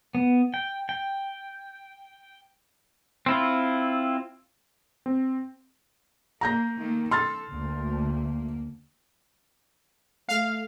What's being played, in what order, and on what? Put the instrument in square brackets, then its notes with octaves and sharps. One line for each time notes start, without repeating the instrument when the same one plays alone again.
[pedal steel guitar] B3
G5
G5
C4 E4 F4
[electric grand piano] C4
[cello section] A#3 [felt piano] A#5 G6 A#6
[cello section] D#3 A3 A#3
[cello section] A4 [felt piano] C6 F6 A6
[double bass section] D2 A3 [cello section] A#3
[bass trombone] A3 [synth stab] F5